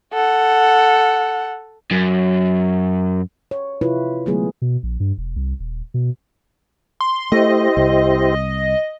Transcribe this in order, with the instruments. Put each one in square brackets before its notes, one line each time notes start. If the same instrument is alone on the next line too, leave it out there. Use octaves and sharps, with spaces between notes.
[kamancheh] A4 F#5
[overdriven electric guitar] F#2
[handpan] C#5
C3 E4 F4 B4
D3 F#3 G#3 A3 B3 G#4
[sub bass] B2
A#1
G2
E1
C2
D#1
B2
[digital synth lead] C6
[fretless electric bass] A3 [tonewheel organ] E4 G4 C5 [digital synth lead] D#5
[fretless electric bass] C2